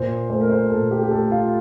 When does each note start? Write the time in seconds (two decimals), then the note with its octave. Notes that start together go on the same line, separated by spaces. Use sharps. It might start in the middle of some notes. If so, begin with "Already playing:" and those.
Already playing: A#2 C5
0.30 A3 C5
0.41 A#4
0.50 C5
0.70 A#2 A4
0.91 G4
1.03 G4
1.11 A3 A4
1.31 F4